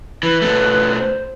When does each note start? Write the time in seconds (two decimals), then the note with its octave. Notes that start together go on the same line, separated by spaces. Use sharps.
0.23 E3 B4
0.42 B2 A3
0.98 C5